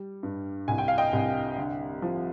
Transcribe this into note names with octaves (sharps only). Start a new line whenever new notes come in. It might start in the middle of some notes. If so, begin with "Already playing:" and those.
Already playing: G3
G2
C2 G#5
G5
F5
D#5 G5
C2
D3
F3